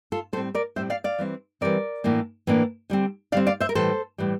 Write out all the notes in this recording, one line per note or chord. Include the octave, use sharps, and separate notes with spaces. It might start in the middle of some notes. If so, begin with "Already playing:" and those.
F4 A4
A2 G3 C4 A4 C5
A#4 D5
A2 G3 C4 C5 E5
D5 F5
D5 F5
E3 G3 C4
E3 G3 C4 A#4 D5
A2 E3 A#3 D4
A2 E3 A#3 D4
D3 G3 C4
D3 G3 C4 D5 F5
D5 F5
C5 E5
A#4
A2 E3 G3 A4 C5
A2 E3 G3